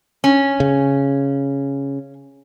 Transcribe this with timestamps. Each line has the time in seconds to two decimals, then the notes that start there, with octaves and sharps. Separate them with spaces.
0.24 C#4
0.60 C#3